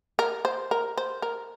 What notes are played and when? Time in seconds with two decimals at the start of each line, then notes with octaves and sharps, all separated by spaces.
0.19 A#4
0.45 C5
0.71 A#4
0.98 C5
1.22 A#4